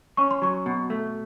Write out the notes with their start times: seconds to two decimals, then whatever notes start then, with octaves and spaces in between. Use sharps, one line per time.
0.17 C#4 C#6
0.31 C6
0.42 F#3 C#6
0.66 B2
0.90 A3